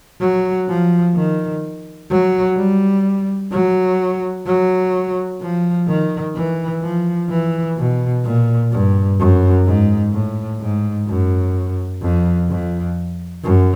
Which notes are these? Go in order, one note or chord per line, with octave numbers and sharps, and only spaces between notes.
F#3
F3
D#3
F#3
G3
F#3
F#3
F3
D#3
E3
F3
E3
B2
A#2
G2
F#2
G#2
A2
G#2
F#2
F2
F2
F#2